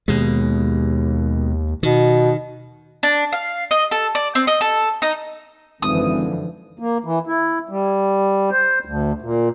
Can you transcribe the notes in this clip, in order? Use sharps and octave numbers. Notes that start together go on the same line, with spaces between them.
D#2 B2 G#3
B2 D#3
D4
F5
D#5
A4
D5
C4
D#5
A4
D#4
G#1 F#2 D3 E3 F3 D#6
A#3
E3
E4
G3
C5
D2
A#2